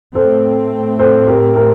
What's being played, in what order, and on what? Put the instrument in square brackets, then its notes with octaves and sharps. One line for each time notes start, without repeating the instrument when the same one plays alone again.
[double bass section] A2 A3 C4 [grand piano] A4 C5
[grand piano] A4 C5
G4 A#4
G4 A#4